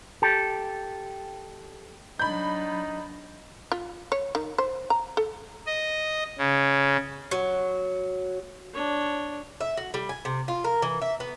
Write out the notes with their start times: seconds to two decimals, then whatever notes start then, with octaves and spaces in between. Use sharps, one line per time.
0.22 G4 A4
2.19 F#3 D4 D#4 B5 G6
3.72 F4
4.12 C#5
4.35 D#3
4.58 C5
4.90 A#5
5.17 A4
5.67 D#5
6.38 C#3
7.31 F#3
8.74 D4 C#5
9.61 E5
9.77 F#4
9.94 G3
10.09 G#5
10.25 C3
10.48 F4
10.64 A#4
10.82 E3
11.02 E5
11.20 B3